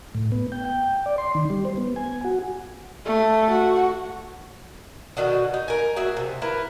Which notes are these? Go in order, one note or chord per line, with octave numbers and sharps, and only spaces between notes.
A2
B3
G5
G5
D5
C6
D#3
G3
C5
B3
G#5
F#4
A3
F#4
B2 D3 D#3 F#4
D#4
A#4 G#5
F#4 G#4 E5
C3
E4 A#4 B4